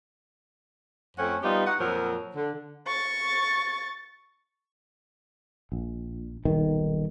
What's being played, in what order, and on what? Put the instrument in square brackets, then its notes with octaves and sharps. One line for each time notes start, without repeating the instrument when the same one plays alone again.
[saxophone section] F2 A3 C4 C#4 F#5
G3 B3 D#4 F4 G4
D#4 F#4 F#5
F2 A#2 F3 F#3 A#4
D3
[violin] C#6 A6
[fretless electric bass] A#1
D#1 B1 D#3